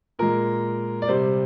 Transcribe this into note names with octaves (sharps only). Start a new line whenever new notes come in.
A#2 G#3 A#4
D5
C3 G3 C5